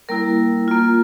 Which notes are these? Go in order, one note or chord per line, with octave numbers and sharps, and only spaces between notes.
G3 A#3 E4 A#4
A#3 F4